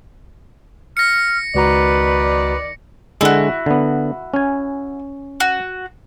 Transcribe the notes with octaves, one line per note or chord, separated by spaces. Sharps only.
F6 A#6 C#7
C#2 D#3 F#4 B4 D5 A#5
D3 G#3 E4 F#4
D3 B3
C#4 G#5
F#4